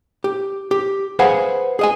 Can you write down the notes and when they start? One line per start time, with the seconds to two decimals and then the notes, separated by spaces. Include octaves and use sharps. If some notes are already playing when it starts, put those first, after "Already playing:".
0.24 G4
0.71 G4
1.19 G#4 B4 C5 F5 F#5 G#5
1.79 G#4 D#5 G#5